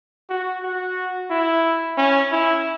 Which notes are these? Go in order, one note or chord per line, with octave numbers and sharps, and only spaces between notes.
F#4
F#4
E4
C#4
E4